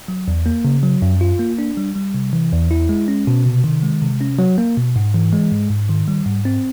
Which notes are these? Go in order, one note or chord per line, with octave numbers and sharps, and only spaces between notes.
F#3
E2
A#3
C#3
F#3
F#2
F4
A#3
D4
G3
G3
C3
E3
E2
E4
G#3
C#4
B2
C3
D#3
G#3
C3
C#4
F#3
A#3
B2
G#2
E3
G#3
G#2
G#2
D#3
G3
G#2
C4